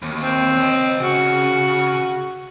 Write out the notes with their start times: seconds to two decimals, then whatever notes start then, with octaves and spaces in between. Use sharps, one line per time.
0.02 D#2
0.23 C4
0.57 C#5 D#5
1.00 C#3 F#4